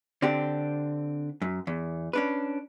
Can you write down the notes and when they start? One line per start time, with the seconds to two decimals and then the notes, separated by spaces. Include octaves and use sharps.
0.22 D3 C4 D4 G4
1.42 F#2
1.67 E2
2.13 C#4 D4 B4